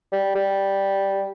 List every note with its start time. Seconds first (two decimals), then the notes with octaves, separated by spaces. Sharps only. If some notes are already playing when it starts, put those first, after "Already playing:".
0.12 G3
0.35 G3